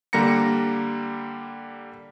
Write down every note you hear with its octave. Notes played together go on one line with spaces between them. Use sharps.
D3 G3 A#3 A#5 A#6 C#7